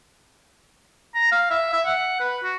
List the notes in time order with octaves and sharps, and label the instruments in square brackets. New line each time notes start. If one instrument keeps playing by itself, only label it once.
[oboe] A#5
F5
E5
E5
F#5
B4
F#4